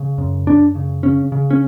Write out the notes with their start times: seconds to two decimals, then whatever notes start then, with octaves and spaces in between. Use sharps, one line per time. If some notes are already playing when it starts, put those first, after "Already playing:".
Already playing: C#3
0.18 F#2
0.47 F#2 D4
0.75 C#3
1.03 C#3 C#4
1.32 C#3
1.51 C#4